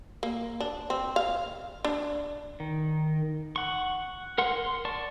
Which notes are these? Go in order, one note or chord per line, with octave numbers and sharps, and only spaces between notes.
A#3
D4
C4
F5
D4
D#3
F#5 C#6
A#4 F#5 C6
C6
D5 A5 C#6